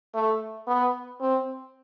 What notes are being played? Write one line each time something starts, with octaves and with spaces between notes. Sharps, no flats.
A3
B3
C4